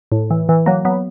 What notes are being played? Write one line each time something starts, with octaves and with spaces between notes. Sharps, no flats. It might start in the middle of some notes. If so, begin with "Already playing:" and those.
A2
E3
E3
F#3 A#3
F#3 B3